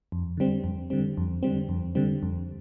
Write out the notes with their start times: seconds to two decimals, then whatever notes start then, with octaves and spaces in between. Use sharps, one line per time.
0.12 F2
0.37 D3 G3 C4
0.64 F2
0.90 D3 G3 C4
1.17 F2
1.43 D3 G3 C4
1.69 F2
1.95 D3 G3 C4
2.23 F2